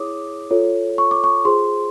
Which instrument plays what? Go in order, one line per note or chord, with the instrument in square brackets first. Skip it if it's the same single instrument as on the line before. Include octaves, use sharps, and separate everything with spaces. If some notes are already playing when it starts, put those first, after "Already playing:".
Already playing: [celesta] E4 G#4 C#5 D6 D#6
F4 A4 C#5
C#6
D6
C#6
F4 G#4 C5 C6